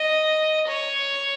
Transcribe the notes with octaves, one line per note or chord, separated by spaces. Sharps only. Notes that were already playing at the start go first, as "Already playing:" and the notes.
Already playing: D#5
C#5